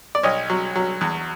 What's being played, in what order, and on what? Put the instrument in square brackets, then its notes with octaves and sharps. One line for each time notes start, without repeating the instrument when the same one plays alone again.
[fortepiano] D5
B1 C#5 D#5
F#3
F#3
E2